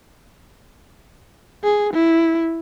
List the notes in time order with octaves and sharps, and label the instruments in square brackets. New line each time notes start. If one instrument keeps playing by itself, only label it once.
[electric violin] G#4
E4